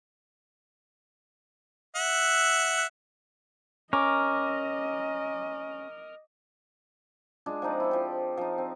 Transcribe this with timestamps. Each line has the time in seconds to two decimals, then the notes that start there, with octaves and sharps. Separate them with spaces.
1.96 E5 F#5
3.93 C#4 A#4 D#5 D6
7.46 G#3 D4 F4
7.62 F3 C4 D#4 D5
7.80 E4 A4
7.91 F3 G4
8.37 F3 D#4
8.58 C4